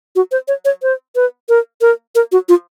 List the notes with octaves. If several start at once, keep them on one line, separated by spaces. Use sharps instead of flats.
F#4
C5
C#5
C#5
C5
B4
A#4
A#4
A#4
F#4
F4